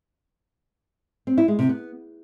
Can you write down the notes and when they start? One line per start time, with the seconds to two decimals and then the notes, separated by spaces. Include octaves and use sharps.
1.27 C4
1.38 E4
1.48 G#3
1.59 C3
1.69 B3